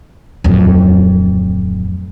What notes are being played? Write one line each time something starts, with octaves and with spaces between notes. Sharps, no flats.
D1 F2